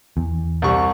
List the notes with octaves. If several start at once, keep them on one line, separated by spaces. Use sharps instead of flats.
E2
C2 G3 C#6